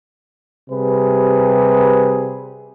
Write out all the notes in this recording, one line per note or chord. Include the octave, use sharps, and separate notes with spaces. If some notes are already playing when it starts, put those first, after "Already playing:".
C3 G3 G#4 B4